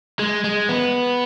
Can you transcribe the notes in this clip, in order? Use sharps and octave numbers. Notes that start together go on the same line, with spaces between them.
G#3
G#3
B3